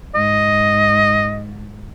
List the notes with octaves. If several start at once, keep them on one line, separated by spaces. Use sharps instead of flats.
G#2 D#5